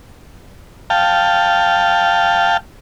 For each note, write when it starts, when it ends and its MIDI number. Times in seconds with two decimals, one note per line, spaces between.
0.90 2.57 77
0.90 2.57 79
0.90 2.57 81